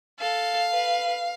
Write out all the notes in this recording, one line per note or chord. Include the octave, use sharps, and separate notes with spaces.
A4 F5
B4